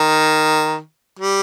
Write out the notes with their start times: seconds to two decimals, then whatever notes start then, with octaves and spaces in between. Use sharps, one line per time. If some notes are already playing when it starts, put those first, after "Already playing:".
Already playing: D#3
1.19 G3